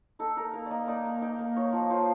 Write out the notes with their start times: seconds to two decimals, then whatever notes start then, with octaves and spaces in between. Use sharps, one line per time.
0.19 D#4 A4
0.37 D#4 A#4
0.53 A#3 A#4
0.66 A#3 D5 D#5
0.88 D#4 D5
1.05 A#3
1.22 D#4 G5
1.39 A#3
1.56 D#4 C#5
1.73 F3
1.90 F3 C5